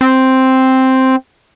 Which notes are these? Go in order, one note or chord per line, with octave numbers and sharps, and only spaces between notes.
C4